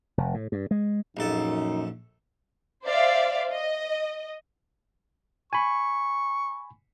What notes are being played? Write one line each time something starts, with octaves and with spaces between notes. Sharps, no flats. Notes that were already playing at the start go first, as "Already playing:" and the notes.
F1
A2
G2
G#3
A#1 F#2 D#4 A4
C5 D5 E5 F5
D#5
G#5 B5 C#6